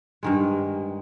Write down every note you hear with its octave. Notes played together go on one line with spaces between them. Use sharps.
G2 D#3 G#3